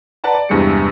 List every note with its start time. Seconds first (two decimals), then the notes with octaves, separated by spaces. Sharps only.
0.24 B4 D5 F#5 A5 A#5
0.35 D5
0.49 E2 G2 C3 G#3 G4 C#7